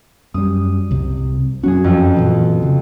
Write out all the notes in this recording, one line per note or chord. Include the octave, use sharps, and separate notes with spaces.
F#2 G3 D#6
C2 C3
F#2 F#3 C#4 F#4 G#4
F2 F4
A#2 E3
C#3